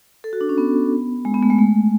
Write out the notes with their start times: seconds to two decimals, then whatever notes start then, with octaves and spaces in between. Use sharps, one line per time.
0.24 A4
0.33 F#4
0.41 D4
0.49 C#4
0.58 B3
1.25 G#3
1.34 B3
1.43 A3
1.50 G#3
1.59 A3